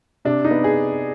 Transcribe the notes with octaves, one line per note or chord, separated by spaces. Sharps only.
C3 D4
D#4
B3
G#4